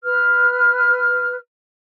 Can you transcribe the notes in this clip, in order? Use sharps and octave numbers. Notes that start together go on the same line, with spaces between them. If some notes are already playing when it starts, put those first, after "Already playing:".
B4 F6